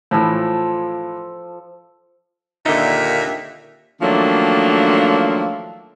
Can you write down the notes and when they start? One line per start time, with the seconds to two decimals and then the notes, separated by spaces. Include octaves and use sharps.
0.11 A2 E3 F3 A4
2.66 D#2 A#2 D3 D#4 E5
4.01 D#3 F3 F#3 A3 A#3 D4